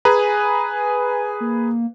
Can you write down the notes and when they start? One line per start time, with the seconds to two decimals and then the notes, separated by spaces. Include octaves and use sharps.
0.05 G#4 B4 G#5 A#5
1.41 A#3